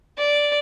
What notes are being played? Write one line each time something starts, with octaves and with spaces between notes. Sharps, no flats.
D5